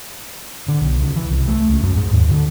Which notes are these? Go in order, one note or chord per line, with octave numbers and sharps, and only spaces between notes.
D3
B1
C#2
E3
C2
A3
C#2
F#2
G#2
D#2
D3